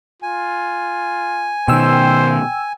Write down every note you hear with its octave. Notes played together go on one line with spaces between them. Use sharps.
F4 G#5
B2 D#3 C5 G5 E6